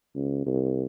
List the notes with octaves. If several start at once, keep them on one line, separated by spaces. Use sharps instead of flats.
C#2
C2